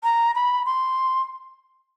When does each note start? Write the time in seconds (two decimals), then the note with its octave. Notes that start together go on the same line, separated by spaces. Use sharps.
0.04 A#5
0.35 B5
0.65 C6